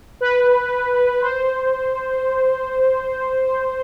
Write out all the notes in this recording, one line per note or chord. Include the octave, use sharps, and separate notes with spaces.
B4
C5